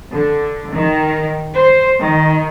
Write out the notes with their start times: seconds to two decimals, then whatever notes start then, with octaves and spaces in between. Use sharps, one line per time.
0.12 D3
0.72 D#3
1.55 C5
2.01 D#3